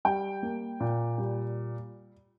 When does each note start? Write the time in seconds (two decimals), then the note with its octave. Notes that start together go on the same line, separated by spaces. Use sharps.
0.05 G3 G5
0.43 A#3
0.80 A#2
1.18 G3